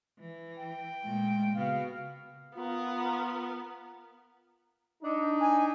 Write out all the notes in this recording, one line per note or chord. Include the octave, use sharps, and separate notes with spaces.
E3
G5
A#2 G#3 A3
C#3 B3 F#4 F5
B3 F4 A#4
D4 D#4
G#5